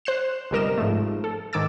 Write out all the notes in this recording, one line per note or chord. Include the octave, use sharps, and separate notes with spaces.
C5 F#6 C7 E7
G1 C3 G3 A#4 D#5 E7
G#2 F3 A3
A4
G#2 D#3 G#5 D6 E6 A6